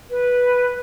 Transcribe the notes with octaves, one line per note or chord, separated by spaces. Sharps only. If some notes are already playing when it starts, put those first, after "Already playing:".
B4